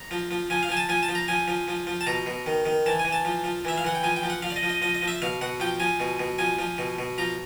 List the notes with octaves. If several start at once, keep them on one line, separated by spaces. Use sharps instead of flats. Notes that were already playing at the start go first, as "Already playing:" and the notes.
Already playing: A#5
F3
F3
F3 G#5
F5
F3 G#5
A5
F3 G#5
A5
F3
A#5
F3 G#5
F3
F3
F3
A5
B2 A#5
B2
D#3
D#3
E3 A5
G#5
E3
A5
F3
F3
E3 E5
F5
E3 F#5
G5
F3 G#5
G5
F3
F#5
F3 F5
D5
D#5
F3
D#5
F3 D#5
D#5
F3
E5
B2 F5
B2 F#5
F3 G5
F3 G#5
B2
B2
F3 G#5
F3
B2
B2
F3 A#5